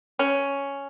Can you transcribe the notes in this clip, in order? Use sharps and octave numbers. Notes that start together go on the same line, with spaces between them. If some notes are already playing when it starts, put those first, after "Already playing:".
C#4